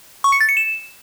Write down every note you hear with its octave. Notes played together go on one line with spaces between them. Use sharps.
C#6
C#7
A6
C#7
E7